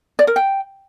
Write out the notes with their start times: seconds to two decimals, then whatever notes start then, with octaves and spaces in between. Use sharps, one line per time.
0.19 D5
0.27 A#4
0.36 G5